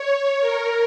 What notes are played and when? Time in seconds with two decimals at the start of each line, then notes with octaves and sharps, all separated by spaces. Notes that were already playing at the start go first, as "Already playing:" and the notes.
Already playing: C#5
0.41 A#4